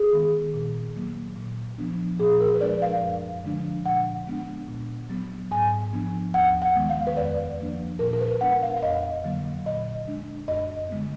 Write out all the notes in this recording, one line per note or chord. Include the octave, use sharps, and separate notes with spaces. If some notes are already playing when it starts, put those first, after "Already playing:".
Already playing: G#4
D#3 G#3 B3
A#2
F#3 A#3
A#2
F3 B3 D4
A#2 G#4
A#4
B4
F3 G#3 D4 D5
F5
F#2
D3 F3 G#3 D4
A#2 F#5
G#3 B3 D4
A#2
F#3 B3
G#2 G#5
F3 B3 D4
D#2 F#5
F#5
D#3 G#3 B3
F5
B4
F2 D5
F3 A#3 D4
A#2 A#4
A#4
B4
G#3 B3 D4 F#5
F5
F5
F2 D#5
D3 F#3 A#3
A#2 D#5
G#3 D4
F#2 D#5
D3 G#3 B3